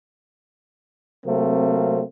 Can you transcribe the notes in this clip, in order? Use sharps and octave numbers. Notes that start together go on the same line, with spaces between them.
C3 F#3 A3 A#3 C4